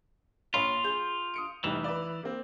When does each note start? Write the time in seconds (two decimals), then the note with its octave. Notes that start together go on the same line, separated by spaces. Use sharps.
0.54 A#1 F4 C#5 B5
0.84 G#4 G6
1.34 D#6 C#7 D7
1.64 F1 E3 G3 D#4
1.84 B4 D5
2.23 A#3 C4